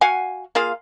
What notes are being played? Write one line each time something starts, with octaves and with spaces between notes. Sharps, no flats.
F#4 F5 F#5 G#5
A#3 F4 G#4 F5